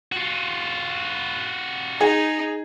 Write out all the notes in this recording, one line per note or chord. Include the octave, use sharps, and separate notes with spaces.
F4 F#4
D#4 G#4